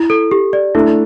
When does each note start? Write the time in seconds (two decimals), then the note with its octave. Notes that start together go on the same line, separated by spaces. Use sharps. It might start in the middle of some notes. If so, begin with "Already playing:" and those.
Already playing: E4
0.10 A4
0.31 G4
0.53 D5
0.75 A3 D4 E4